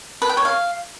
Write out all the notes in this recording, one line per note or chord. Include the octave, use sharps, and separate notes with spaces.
B4
G5
C#5
F5